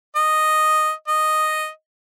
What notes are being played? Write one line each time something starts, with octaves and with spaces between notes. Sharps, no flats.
D#5
D#5